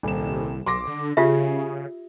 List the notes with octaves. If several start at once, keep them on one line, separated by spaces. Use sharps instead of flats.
D#1 C2 E7
B1 C6 D6 A#6
D3
C#3 F4 G4 G#4 E5